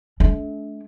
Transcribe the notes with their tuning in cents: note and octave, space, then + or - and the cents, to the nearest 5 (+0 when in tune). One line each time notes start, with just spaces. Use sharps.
A3 -40 D4 -35